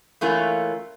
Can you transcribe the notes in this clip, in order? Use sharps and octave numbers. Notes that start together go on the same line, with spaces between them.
E3 A3 A#3 C#4 F4